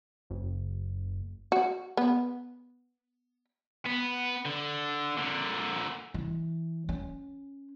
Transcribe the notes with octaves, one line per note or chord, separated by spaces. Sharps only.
F#1
F#4
B3
B3
D3
A#2 D3
E3
C#4